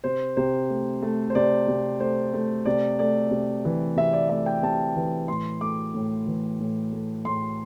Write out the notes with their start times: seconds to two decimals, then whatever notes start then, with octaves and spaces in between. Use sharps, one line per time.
0.04 C3 C5
0.37 C3 C5
0.70 A3
1.02 A3
1.30 C5
1.35 C3 D5
1.68 C3
2.00 A3 C5
2.34 A3
2.65 C3 D5
2.99 A3 D5
3.31 C3
3.65 E3
3.97 C3 E5
4.13 D5
4.29 A3 E5
4.46 G5
4.63 C3 A5
4.96 E3
5.28 A2 C6
5.61 A3 D6
5.94 A2
6.27 E3
6.60 A2
6.93 A3
7.25 A2 C6